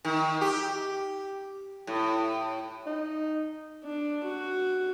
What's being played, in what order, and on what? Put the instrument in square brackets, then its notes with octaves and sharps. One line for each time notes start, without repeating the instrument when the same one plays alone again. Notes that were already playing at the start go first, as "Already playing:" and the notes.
[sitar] D#3
G4
A2
[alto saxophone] D#4
[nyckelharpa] D4
F#4